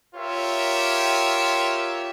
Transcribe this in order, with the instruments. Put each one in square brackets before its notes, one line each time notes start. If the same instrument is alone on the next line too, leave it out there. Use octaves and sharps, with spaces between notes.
[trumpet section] F4 G4 A#4 C#5 E5